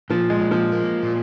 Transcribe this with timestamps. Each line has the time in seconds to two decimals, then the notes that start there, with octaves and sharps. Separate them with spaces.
0.10 A#2 F3
0.30 G#3
0.41 A#2
0.51 F3
0.72 A#3
1.03 A#2